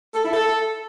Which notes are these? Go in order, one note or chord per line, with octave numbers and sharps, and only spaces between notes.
A4
E4
A4